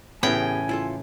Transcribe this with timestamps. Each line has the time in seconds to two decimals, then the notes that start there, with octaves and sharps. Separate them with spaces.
0.23 A2 C#3 E3 B3 G4 G5 G#5
0.69 E4 F4 A4